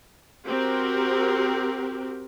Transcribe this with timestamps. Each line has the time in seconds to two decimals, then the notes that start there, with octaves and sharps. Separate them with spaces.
0.48 C4 F#4 G4 A#4